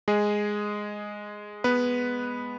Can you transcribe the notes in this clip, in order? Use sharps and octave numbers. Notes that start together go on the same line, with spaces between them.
G#3 G#4
B3 B4